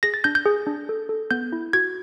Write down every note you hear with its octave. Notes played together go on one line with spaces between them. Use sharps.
G#4 A#6
A6
D4 G6
G6
G#4
D4
A4
A4
B3 G6
E4
F#4 G#6